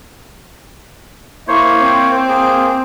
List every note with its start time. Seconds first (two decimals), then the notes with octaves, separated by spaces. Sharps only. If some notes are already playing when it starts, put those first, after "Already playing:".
1.48 A#3 E4 C5 C#5
1.80 C4
2.29 A#3 G#4